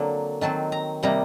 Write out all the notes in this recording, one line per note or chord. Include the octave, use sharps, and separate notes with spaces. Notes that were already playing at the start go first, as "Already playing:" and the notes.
Already playing: D3 F#3 A#3 C4
D#3 F#3 C4 A5
A#5
C3 G3 A#3 D#4 A#5